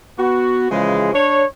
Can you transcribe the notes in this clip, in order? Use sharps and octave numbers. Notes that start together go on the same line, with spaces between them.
B3 F#4
C#3 E3 F3 G#3
D4 C#5